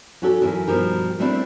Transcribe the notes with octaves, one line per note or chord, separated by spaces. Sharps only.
F#3 C#4 F#4 G4 A4
F#2 E3
G2 B2 F3 G4 A#4
G3 A3 B3 C4 D4 E4